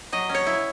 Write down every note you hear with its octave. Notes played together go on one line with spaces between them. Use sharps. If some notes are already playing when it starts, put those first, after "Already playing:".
F#3 D#5
C#4
C#5
E4